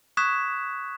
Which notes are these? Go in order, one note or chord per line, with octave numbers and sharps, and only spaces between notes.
C#6 D#6 F#6 G#6 B6 E7